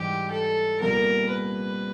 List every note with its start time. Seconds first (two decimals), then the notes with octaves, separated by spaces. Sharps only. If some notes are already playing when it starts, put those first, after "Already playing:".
Already playing: G#2 E3 G3 G4
0.30 A4
0.80 C2 A#2 G3 B3 A#4
1.30 B4